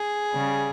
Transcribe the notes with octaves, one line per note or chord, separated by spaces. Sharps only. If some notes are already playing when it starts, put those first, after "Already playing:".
Already playing: G#4
C#3 G3